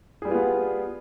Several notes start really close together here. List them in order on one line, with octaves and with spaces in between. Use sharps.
G#4 G3 B4 F4 B3